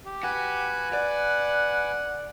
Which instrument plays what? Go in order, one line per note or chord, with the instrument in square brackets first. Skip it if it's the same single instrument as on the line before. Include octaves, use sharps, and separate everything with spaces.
[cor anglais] G4
[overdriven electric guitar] F#4 [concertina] B4 G#5
[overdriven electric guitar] D5 [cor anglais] F#5